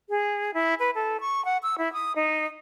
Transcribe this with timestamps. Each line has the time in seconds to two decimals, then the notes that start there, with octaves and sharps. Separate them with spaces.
0.09 G#4
0.54 E4
0.80 B4
0.95 A4
1.20 C#6
1.45 F#5
1.63 E6
1.78 E4
1.93 D#6
2.16 D#4